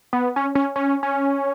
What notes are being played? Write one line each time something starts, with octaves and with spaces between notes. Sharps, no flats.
B3
C#4
C#4
C#4
C#4